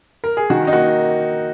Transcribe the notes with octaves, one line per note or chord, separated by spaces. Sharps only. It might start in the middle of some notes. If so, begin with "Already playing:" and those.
A#4
G#4
D#3 F#4
D#4
A#3 F#4